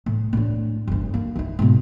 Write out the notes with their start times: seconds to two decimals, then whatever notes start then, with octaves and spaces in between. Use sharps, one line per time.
0.06 A2
0.33 A2 D4
0.87 G1 D2
1.14 A#3
1.36 D#3 E4
1.59 G#2 B2